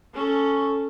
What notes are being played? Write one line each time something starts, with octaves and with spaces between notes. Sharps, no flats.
C#4 A4